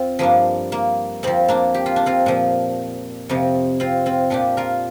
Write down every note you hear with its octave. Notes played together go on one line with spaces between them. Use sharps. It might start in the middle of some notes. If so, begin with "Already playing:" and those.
Already playing: F2 C4 F4
G2 F3 A#3 D4
A#3
F2 F3 C4
A#3 D4
G4
F4
D4
C4 F4
A#2 F3
F2 C3 F3
C4 F4
C4 F4
A#2 F3 D4 G4
F4 A#4